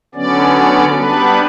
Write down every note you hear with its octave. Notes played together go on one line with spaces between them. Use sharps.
D3 F#3 B3 C#4 D5
G3 B3 D4 B4